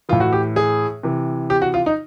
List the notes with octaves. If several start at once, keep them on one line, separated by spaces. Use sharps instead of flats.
A2 E3 F4
F#4
G4
G#4
C3 E3
G4
F#4
F4
D#4